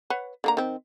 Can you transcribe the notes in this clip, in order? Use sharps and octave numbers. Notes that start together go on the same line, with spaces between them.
B4 C#5 F#5
D3 A#3 A#5
D#3 C4